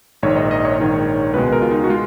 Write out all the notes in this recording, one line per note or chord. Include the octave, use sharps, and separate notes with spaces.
A#1 G#2 D#3 C#5
D#5
D#5
C#5
A#1 G#2 D#3
C#2 B2 G#3 B4
A#4
F4
D#4
F#4
G#3 F4